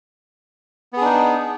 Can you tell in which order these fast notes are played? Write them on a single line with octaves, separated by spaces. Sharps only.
B3 G#4 D4 D#4